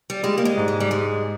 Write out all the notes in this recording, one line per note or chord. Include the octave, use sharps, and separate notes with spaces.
G3
G3 G#3
A#3
G#3
G#2
G#3
G3
G#3